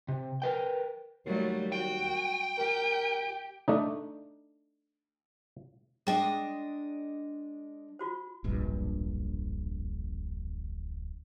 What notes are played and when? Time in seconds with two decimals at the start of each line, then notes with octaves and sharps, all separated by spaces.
0.08 C3
0.42 A#4 B4 G5
1.26 D#2 F#3 G3 A3
1.72 F#4 G5
2.57 G4 A#4
3.68 A3 D4 D#4
6.07 G#3 D4 G#4 D#5 G5
7.99 F4 F#4 C5
8.44 D1 A#1 G2